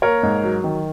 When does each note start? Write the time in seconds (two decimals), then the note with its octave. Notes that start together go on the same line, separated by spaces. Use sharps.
0.02 A#3 A#4 C#5
0.23 G#2
0.44 F#3
0.64 D#3